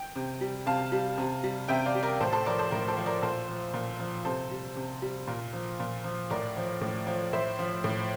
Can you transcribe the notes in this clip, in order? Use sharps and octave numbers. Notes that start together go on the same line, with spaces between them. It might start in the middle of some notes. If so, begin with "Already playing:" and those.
Already playing: G5
C3
G3
C3 F5 A5
G3
C3
G3
C3 E5 G5
D5 F5
G3
A#4 D5
A2 A4 C5
A4 C5
F3 A#4 D5
A4 C5
A2 A#4
A4 C5
F3
A#4 D5
A#2 A4 C5
F3
A#2
F3
C3 A4 C5
G3
C3
G3
A#2 A#4
F3
A#2
F3
A2 A#4 D5
F3
A2
F3
A2 C5 E5
F3
A2